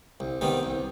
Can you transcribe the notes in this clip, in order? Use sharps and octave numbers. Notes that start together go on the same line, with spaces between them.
C2
C3 D#3 G3 B3
C2